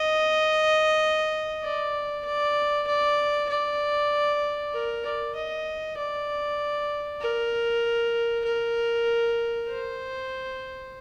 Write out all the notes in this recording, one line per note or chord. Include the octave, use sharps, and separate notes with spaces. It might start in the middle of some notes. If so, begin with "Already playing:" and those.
Already playing: D#5
D5
D5
D5
D5
A#4
D5
D#5
D5
A#4
A#4
C5